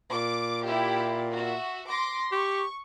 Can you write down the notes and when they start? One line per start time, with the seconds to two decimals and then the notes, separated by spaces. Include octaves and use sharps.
0.12 A#2 D6
0.65 E4 G4
1.34 F#4 E5
1.88 C6 D6 A#6
2.32 G4 C#6